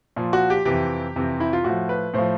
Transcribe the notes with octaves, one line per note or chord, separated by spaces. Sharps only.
A#2 F3
F#4
G4
F2 C3 E3 G4
F2 C3 E3
E4
F4
A2 F3 F#4
B4
A2 F3 C5